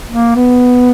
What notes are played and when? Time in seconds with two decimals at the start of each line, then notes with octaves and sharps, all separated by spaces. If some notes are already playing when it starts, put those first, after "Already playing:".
0.11 A#3
0.35 B3